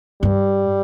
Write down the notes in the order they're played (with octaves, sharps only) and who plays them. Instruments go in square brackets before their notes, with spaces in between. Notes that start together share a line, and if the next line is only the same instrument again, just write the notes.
[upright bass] G2 [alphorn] G3